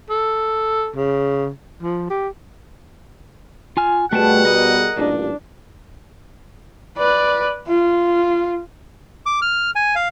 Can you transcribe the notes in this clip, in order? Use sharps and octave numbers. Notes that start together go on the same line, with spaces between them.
A4
C#3
F3
G4
F4 G#5 F6
B2 G3 A3 B3 G#4 F#5 G5 A5
A#4 D#5
A1 G2 A#2 D4
B4 D5
F4
D6
F6
G#5
F5